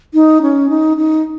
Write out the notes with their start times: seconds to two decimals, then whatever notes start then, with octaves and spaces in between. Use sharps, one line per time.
0.14 D#4
0.42 C#4
0.70 D#4
0.97 D#4